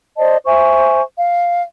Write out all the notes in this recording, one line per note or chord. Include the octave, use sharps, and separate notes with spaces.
C5 D5 D#5 A5
C5 E5 G#5 C#6
F5